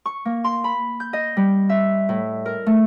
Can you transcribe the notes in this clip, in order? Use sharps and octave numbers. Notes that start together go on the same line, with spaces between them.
C#6
A#3
C6
B5
G6
D#5
G3
E5
A2
A#4
A3